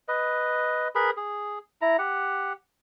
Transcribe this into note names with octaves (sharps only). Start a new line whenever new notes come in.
B4 D#5
G#4 A#4 B4 B5
G#4
E4 A#5
G4 F#5